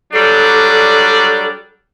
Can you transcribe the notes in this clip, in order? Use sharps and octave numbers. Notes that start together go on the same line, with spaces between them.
F#3 G3 D4 A4